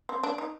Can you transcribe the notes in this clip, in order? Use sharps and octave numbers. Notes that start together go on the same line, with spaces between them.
C4
D4
D#4